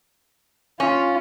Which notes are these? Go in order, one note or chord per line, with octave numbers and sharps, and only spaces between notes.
C#4 F4